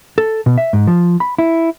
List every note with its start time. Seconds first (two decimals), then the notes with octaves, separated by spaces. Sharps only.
0.18 A4
0.46 B2
0.58 E5
0.73 G#2
0.87 F3
1.20 B5
1.39 E4